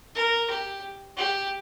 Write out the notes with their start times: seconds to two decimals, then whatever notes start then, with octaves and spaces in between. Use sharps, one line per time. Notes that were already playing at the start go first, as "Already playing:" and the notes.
0.15 A#4
0.50 G4
1.17 G4